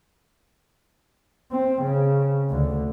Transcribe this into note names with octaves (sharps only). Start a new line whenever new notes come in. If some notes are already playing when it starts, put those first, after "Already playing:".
C4
C#3
D2 D3